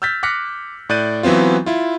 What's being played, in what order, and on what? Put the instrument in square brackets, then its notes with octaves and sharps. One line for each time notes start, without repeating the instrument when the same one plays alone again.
[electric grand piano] E6 F6 G6 A6 B6
D6 F6 F#6 A#6 B6 C#7
A2 D5 F#6 G6 A6 D#7
E3 F#3 B3 C4 F4
E4 F4